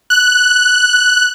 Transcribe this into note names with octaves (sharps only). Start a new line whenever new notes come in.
F#6